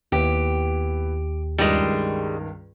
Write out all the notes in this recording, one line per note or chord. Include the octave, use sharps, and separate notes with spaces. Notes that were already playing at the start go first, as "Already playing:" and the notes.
D#2 B3 E4 G4 B4
C#2 G2 D#3 G3 G#3